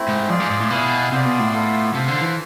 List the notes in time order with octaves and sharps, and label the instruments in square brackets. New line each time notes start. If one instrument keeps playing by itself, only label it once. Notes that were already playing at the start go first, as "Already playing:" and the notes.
Already playing: [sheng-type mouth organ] A3 C4 E4
[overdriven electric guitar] G#2
[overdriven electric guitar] F2 [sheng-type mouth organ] F4 G#4 D5
[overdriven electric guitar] G#2
G#2
A2
[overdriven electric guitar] B2 [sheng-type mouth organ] E4 G#4 B4 F5 G#5
[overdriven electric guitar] C3 [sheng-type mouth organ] B3 F4 G#4 D5
[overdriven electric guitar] B2
A2
[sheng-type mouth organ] B3 F4 A4
[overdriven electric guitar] C3 [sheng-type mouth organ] F4 A4 C5
[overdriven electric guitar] D3
E3